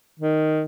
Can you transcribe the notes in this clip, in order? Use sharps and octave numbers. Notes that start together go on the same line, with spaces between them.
D#3